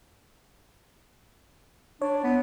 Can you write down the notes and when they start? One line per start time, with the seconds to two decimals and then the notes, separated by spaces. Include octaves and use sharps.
2.02 D4 C#5
2.24 B3